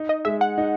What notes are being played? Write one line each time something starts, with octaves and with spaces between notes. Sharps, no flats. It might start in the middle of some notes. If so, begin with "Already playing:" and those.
Already playing: D#4
D#5
G#3 E5
F#5
D#4